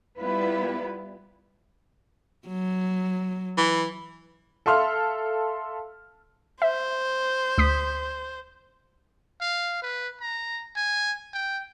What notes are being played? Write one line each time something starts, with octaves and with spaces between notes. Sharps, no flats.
G3 B3 E4 F4 B4
F#3
E3
A4 E5 F5 C6 F6
C5 E5
D2 D#6 B6
F5
B4
A#5
G#5
G5